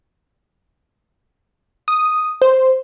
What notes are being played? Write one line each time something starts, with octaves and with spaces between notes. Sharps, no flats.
D#6
C5